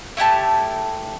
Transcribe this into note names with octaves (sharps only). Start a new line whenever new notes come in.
A3 E4 G4 A5